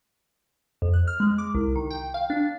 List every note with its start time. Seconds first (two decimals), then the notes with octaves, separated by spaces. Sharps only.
0.82 F2
0.93 F#6
1.07 F6
1.20 G#3
1.38 D6
1.54 C2
1.76 D#3
1.90 G5
2.14 F5
2.30 D4